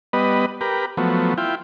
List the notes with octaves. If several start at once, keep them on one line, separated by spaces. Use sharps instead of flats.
G3 B3 B4 D#5
G4 A#4 B4
F3 F#3 A3 B3
E4 F4 G5